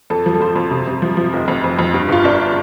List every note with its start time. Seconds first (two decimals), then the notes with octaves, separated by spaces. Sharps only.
0.10 F2 A4
0.26 F3
0.35 A4
0.40 F2 C5
0.56 F2
0.71 C3
0.87 C3
1.02 F3
1.17 F3
1.33 F1
1.48 F2
1.64 F2
1.79 F2
1.94 G2
2.09 G1 F4
2.24 G1 D4